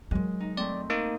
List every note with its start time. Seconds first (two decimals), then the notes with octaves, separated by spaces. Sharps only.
0.11 D#3 F#3 G#3
0.40 D#4
0.57 A3 C4 D5
0.90 A#3 D#4 D#6